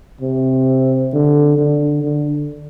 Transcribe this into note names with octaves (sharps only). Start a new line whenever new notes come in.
C3
D3
D3
D3